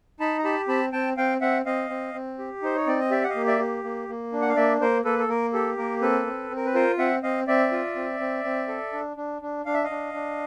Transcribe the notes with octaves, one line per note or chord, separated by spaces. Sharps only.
D#4 A5 B5
A#5
G4 A5 B5
C4 A5 B5
C4 G5 A5
C4 F5 G5
C4 E5 F#5
C4 D#5 F5
C4
C4
G4
D#4 C5
C#5
C4 D5
D#5
G4 D5 E5
F#5
D#5 F5
A#3
D5 E5
G4
A#3
A#3
D4
F#5
F5
A#3 D5 E5
A#3 A#4 C5
A#3 A4 B4
A4
A#3 A#4
G4 A4
A#3 A#4
C4 A4 B4
C4
C4
A#4
B4
F4 A#4 C5
C4 E5 F#5
C4 D#5 F5
C4 D5 E5
F4
C4
C4
C4
A4
D4
D4
D4
D4 F5
E5
D#5 F5
D4
D4